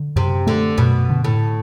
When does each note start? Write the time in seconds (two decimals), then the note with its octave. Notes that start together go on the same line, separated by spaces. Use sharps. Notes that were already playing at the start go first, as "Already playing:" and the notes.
Already playing: D3
0.16 F#2 C3
0.47 D3 A3
0.78 F#2 B2
1.10 D3
1.24 A2